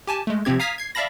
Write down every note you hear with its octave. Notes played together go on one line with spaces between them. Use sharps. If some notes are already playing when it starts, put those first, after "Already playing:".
G4 G#5 A5
G#3 A3
C3 F3 C4 G4 G#6
F5 A#5 D#6 F6 G#6 B6
G#6 C7
D5 E5 F5 A5 B5 A#6